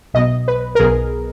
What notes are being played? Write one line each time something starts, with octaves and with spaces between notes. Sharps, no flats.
B1 B2 D#5
B4
A#4
B1 B2 G#4